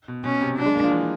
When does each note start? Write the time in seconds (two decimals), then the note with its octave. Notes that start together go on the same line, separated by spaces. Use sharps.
0.08 B2
0.24 B2 C#4
0.41 C3
0.58 F#3 D4
0.66 G#3
0.75 A#3
0.84 F3
0.92 E3